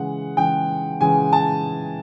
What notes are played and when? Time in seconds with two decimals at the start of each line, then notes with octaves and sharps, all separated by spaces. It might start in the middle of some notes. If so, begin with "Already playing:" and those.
Already playing: C#3 E3 G#3 F#5
0.37 C#3 E3 G#3 G5
1.01 C#3 E3 G#3 G#5
1.33 A5